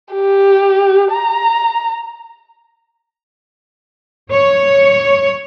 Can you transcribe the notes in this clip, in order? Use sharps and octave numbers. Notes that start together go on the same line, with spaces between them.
G4
A#5
C#5